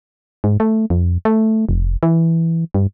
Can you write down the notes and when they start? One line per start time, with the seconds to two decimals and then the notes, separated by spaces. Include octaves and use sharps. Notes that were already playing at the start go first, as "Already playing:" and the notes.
0.44 G#2
0.60 A3
0.90 F2
1.25 A3
1.69 F1
2.03 E3
2.74 G2